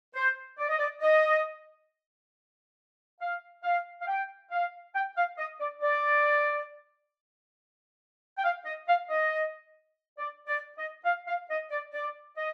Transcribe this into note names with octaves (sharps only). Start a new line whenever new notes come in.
C5
D5
D#5
D5
D#5
F5
F5
F5
G5
F5
G5
F5
D#5
D5
D5
G5
F5
D#5
F5
D#5
D5
D5
D#5
F5
F5
D#5
D5
D5
D#5